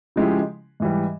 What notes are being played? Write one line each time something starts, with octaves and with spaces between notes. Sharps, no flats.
C#3 F3 G#3 E4 G4
G#2 E3 G3